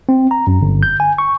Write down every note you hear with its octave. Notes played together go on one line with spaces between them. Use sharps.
C4
A#5
F#2
G1
G6
G#5
C#6